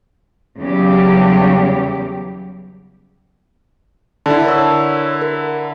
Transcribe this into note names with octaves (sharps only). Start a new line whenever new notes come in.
E2 C#3 F#3 G3 G4
D3 E4 A5
A#4 C#5 E6
A#4